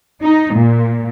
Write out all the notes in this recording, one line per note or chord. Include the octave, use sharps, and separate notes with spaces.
D#4
A#2